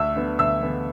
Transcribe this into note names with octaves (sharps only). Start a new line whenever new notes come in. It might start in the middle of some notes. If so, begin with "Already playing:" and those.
Already playing: D2 E5 E6
D3 B3
D2 E5 E6
D3 B3